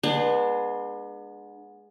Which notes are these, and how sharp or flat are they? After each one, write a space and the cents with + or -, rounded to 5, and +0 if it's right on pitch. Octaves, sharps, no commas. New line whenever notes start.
G#3 +0 B3 -25 D4 +35